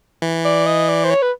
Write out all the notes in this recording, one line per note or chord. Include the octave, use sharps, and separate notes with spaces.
E3
D5
D#5
D5
C5
C#5
B4